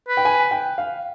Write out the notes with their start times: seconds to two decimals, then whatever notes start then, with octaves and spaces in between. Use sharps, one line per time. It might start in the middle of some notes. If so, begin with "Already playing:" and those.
0.08 B4
0.17 G5
0.25 G#5
0.51 G5
0.78 F5